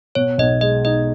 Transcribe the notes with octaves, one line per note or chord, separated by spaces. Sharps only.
B2 C#5
B1 D#5
G#3 D#5
D#4 D#5